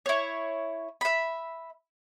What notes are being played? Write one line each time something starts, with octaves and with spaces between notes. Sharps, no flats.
E4 C#5
E5 B5